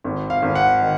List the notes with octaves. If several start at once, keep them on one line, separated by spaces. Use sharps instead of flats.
G#1
F5
G#1
F#5
D#3